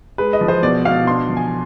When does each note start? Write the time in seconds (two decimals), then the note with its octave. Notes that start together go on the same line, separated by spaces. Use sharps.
0.18 G#3 B4
0.33 D#5
0.41 F3
0.48 C5
0.63 B2 D5
0.85 B2 F5
1.07 D4 C6
1.29 F3
1.37 G#5